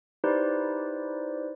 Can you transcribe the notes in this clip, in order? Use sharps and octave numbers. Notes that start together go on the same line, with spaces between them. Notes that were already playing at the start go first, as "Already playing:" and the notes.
D#4 E4 G4 B4 C5 D5